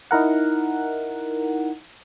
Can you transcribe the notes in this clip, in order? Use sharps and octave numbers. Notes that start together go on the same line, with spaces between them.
D#4 E4 A#4 F#5